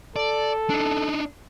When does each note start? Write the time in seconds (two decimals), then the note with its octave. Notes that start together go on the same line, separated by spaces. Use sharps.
0.16 A4 D5
0.70 D4 D#4